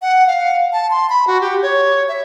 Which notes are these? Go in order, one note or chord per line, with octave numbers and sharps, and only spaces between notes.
F#5
F5
A5
C6
B5
F#4
G4
C#5
E5